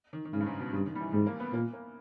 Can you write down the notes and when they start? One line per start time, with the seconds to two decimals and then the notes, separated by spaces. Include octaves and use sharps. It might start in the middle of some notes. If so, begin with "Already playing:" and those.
0.13 D#3
0.25 D#3
0.33 G#2 C#3
0.40 G2
0.46 G#2
0.60 B2
0.72 G2 C#3
0.86 D#3
0.95 G3
1.00 E3
1.12 G#2 G3
1.26 A#3
1.40 B3
1.53 A#2 A#3
1.73 A#3